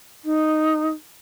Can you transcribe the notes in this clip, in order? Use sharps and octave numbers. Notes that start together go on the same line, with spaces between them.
D#4